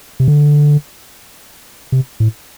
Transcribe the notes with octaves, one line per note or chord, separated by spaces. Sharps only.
C3
D3
C3
A2